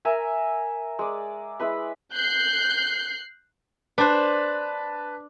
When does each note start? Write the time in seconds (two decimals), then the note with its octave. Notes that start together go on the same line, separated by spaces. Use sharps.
0.05 A#4 E5 G#5 A#5
0.99 G#3 D5
1.60 G#3 E4 B4 B5
2.12 F#6 G6 C7
3.98 D4 B4 C5 A5